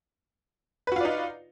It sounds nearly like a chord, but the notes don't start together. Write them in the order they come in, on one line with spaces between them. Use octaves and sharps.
B4 F#4 F4 D5 D#4